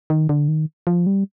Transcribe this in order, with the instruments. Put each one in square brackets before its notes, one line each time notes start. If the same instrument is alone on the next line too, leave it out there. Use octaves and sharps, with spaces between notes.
[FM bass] D#3
D3
D#3
F3
G3